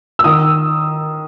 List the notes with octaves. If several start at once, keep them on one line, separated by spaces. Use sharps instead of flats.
E6
D#3 D#6